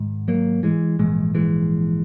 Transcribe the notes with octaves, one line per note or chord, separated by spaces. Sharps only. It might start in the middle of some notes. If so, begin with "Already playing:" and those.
Already playing: G#1 G#2
F#3 A#3
E3 G#3
A#1 G#2 E3 G#3
E3 G#3